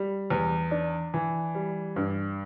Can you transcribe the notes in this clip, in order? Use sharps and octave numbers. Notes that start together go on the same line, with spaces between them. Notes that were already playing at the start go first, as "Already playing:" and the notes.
Already playing: G3
E2
D4
E3
G3
G2